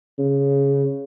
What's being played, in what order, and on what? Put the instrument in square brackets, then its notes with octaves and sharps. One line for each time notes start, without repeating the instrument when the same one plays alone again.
[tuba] C#3